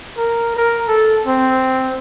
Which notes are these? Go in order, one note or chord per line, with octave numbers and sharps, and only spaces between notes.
A#4
A#4
A4
C4